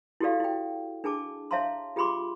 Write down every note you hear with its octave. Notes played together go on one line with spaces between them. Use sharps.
E4 F#4 G4 A4 D5 F5
E4 G5
D4 G#4 A5 D6
C#5 E5 F5 A5 A#5 C6
F4 G4 G#4 B5 C6 D6